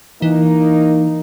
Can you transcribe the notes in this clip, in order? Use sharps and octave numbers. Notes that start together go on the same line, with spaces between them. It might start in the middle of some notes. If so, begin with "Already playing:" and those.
E3 A#3 D#4